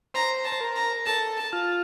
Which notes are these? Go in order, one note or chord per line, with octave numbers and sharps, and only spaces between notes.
C5 A#5
A5
C5
A#4
A#5
A4 A5
A5
F4